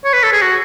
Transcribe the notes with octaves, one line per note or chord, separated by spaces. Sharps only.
C#5
B4
A4
G#4
F#4